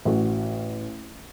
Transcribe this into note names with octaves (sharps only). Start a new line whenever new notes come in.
A1 F#4